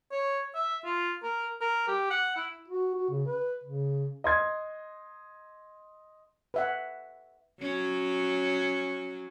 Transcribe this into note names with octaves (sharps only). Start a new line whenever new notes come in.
C#5
E5
F4
A#4
A#4
G4
F#5
E4
F#4
F#4
C#3
B4
C#3
D#5 C6 G#6
B4 E5 F#5
F#3 C#4